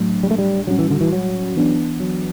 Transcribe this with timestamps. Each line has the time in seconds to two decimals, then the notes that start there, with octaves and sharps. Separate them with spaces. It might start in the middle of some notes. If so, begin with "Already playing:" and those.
Already playing: A2 F#3 A3 D4
0.23 G3
0.31 A3
0.38 G3
0.67 A2 F#3 G3 C#4 F#4
0.79 E3
0.90 D3
1.01 E3
1.12 F#3
1.56 E3 B3 D4
2.00 F#3